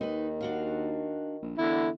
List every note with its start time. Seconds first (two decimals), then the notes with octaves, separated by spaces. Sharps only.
0.01 D#2 D#3 D#4 B4
0.41 D4 F#4 F5
1.43 A#1
1.58 E2 D3 E4